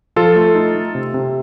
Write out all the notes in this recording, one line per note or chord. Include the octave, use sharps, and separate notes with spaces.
F3 F4 A4
A3
D#4
A3
C3
C3